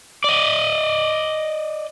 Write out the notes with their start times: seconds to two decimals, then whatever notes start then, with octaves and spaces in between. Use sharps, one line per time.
0.24 D5 D#5